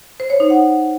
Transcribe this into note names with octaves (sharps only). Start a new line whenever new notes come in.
C5
C#5
D#4
F#5